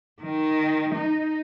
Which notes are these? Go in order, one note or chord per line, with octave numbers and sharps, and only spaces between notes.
D#3
D#4